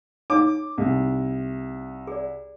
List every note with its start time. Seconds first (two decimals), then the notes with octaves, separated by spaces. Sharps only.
0.30 D#4 C#5 D6
0.78 C2
2.07 G#4 D5